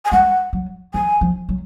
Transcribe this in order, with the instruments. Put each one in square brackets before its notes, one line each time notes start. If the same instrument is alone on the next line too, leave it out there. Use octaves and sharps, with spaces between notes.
[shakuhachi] G#5
[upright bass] G#3 [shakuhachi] F#5
[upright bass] F#3
[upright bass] F3 [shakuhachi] G#5
[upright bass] F3
F#3